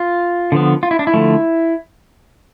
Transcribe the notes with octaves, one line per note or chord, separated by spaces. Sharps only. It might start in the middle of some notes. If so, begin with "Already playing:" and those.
Already playing: F4
D3 F3 B3
F4
E4
D4
E4
D3 F3 A3